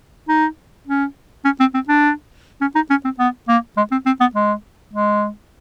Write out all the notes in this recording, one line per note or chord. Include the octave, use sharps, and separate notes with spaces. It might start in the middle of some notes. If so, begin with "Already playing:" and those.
D#4
C#4
C#4
C4
C4
D4
C#4
D#4
C#4
C4
B3
A#3
G#3
C4
C4
B3
G#3
G#3